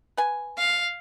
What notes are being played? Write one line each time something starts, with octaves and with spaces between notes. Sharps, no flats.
B4 G#5
F5